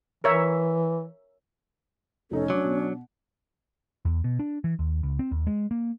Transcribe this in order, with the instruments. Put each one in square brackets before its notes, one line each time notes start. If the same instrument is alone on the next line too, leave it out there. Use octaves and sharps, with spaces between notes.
[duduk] E3 [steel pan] A#4 C#5 E5
[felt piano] F1 D#4 [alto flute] C#4 [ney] A4
[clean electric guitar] F#3 [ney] D4 [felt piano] D6
[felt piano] B2
[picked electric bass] E2
B2
D4
E3
D#2
C#2
C4
D#2
G#3
A#3